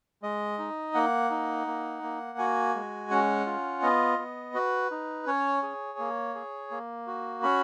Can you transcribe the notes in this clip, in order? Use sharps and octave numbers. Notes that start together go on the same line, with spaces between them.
G#3 D#5
D#4
A#3 F#5
D#4
A#3
A#3
F#4 G#5
G#3
C#4 F#5
F4
B3 D#5
B3
F#4 B4
D#4
C#4 C#5
G#4
A#3
G#4
A#3
F#4
C#4 B5